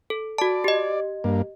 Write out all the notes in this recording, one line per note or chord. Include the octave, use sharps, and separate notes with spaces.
A4
F#4 D5 A5
G4 D#5
G2 A#3